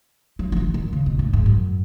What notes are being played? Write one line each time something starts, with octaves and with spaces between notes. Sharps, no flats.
F#3
F#3
E3
D#3
C#3
B2
A2
G#2
F#2